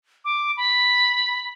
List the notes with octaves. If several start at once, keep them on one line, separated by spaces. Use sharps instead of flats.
D6
B5